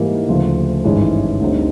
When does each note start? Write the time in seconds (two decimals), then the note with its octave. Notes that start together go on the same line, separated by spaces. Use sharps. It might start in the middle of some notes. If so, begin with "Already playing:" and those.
Already playing: G#2 E3 G3 A#3 D#4
0.28 D2 C#3 F3 A3
0.84 G#1 G2 E3 G#3 C#4
1.40 D2 D3 G3 C4 D#4